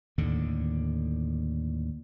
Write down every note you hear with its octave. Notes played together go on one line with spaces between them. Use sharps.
D#2 A2 D3